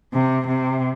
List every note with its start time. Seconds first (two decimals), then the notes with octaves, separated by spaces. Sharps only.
0.13 C3
0.48 C3